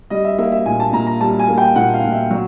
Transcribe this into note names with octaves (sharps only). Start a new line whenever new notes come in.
G3 D#5
E5
A#3 E5
E5
A#2 G#5
A5
A#2 A#5
A#5
G3 A5
G#5
A#3
G5
A#2 F#5
F5
A#2
E5
F#3